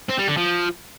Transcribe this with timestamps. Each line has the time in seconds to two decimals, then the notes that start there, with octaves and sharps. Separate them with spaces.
0.09 C4
0.18 G3
0.28 D3
0.37 F3